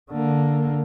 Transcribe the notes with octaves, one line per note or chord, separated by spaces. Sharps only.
D3 A#3